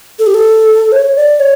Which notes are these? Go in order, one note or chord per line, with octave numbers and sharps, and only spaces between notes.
A4
G4
A4
C#5
D5
C#5